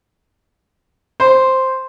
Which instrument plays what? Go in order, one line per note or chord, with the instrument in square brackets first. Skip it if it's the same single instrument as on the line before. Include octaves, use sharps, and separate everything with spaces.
[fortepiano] C5